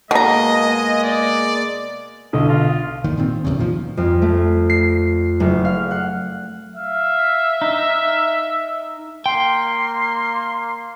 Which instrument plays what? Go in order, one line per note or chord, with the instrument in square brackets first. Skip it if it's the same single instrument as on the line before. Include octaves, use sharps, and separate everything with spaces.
[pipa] B2 A#5 [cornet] G#3 [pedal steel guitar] A#3 [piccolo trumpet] D#5
[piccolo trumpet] D5
[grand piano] B1 [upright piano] D3 [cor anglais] D#5
[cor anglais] F4
[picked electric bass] G1 D#2 D#3
A#2 D#3 C4
B1 E2 G2 C#3
A#2 D#3 F3
[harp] F2
A3
C7
F#1
F5
F#5
[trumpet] E5 [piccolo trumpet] F5
[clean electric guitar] D#4
[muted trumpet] A#3 [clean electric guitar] G5 [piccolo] C6